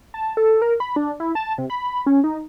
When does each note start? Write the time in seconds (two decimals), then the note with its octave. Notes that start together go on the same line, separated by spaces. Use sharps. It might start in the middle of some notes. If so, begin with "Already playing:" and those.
0.14 A5
0.37 A4
0.62 A#4
0.80 B5
0.96 D4
1.20 E4
1.35 A5
1.58 C3
1.70 B5
2.07 C#4
2.24 D#4